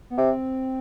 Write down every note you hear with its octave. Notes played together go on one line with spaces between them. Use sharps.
B3
C3 C4